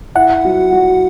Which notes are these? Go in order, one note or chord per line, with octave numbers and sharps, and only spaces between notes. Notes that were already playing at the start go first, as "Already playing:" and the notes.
E4 F#5
F#3
F#3